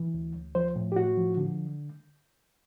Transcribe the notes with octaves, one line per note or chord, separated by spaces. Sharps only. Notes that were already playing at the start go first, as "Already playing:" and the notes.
Already playing: E3
D2
D2
F3 C5
A2
G4
A2 F#4
F3
D3